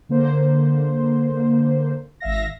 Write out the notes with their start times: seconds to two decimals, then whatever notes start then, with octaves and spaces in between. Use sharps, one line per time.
0.09 D3 A#3 C5
2.20 G#1 E5 F5 A#6